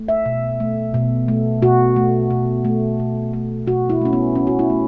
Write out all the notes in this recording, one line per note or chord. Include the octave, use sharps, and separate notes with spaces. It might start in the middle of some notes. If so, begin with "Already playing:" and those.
Already playing: A3
E5
B2
A3
B2
A3
B2 F#4
A3
B2
A3
B2
A3
B2 F#4
E4
A3 C#4
B3
B2 C#4
F#4
E4
A3